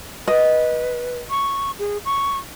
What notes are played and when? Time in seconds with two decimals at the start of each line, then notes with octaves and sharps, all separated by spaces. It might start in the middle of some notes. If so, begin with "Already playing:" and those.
0.27 B4 D#5
1.30 C#6
1.79 G#4
2.05 C#6